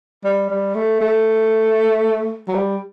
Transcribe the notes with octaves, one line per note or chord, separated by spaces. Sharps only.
G3
G3
A3
A3
F#3
G3